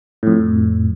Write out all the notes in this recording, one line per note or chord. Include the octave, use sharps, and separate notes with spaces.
F2 A2